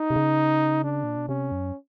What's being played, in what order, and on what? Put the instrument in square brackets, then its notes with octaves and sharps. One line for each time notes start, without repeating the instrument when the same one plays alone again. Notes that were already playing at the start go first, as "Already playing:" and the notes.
Already playing: [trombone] D#4
[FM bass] C3
C#3
[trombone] D4
[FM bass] A#2
B2
[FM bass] C3 [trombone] C#4
[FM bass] F#2